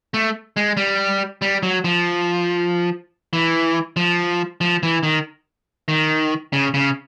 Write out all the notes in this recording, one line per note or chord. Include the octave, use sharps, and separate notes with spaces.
A3
G#3
G3
G3
F#3
F3
E3
F3
F3
E3
D#3
D#3
C#3
C#3